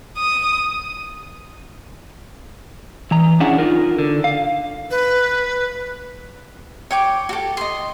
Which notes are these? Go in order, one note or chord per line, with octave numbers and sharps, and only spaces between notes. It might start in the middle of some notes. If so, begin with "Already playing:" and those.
D#6
E3 A#5
C#4 D4 E4 G#4 C#5 F#5
D#4 F4 A#4
D3
F5
B4
C#5 G5 D6
F#4 G4 A4
D#5 C6